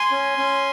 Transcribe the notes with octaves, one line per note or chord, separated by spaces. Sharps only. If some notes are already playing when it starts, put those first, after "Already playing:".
Already playing: G#5 C6
C#4
C#4